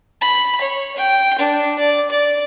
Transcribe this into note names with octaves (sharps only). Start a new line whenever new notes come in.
B5
C#5
G5
D4
D5
D5